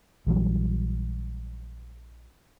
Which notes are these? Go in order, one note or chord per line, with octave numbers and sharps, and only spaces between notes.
A#1 E3 F#3 G3